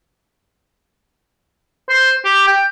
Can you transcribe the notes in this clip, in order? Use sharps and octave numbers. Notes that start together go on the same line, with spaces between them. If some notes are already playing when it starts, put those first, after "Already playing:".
C5
G4
G5